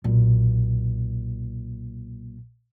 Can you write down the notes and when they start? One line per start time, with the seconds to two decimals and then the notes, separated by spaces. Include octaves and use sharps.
0.04 B1 A#2